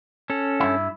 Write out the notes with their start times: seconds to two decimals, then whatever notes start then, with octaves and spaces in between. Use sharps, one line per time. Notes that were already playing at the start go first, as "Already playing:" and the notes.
0.30 C#4 A4
0.60 G2 E4